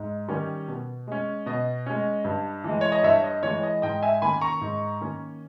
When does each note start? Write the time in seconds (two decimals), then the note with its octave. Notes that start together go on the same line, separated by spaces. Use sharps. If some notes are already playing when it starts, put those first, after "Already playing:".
Already playing: G#2
0.28 D#3 G3 C#4
0.68 B2
1.07 G#3 C#4
1.46 B2 D#5
1.86 G#3 C#4
2.24 G2
2.64 E3 G#3
2.81 C#5
2.92 D#5
3.03 G2 C#5 E5
3.24 D#5
3.43 E3 G#3 C#5
3.63 D#5
3.82 G#2 D#5 G5
4.02 E5 G#5
4.22 D#3 A#3 C#4 G#5 B5
4.41 A#5 C#6
4.61 G#2
5.01 D#3 A#3 C#4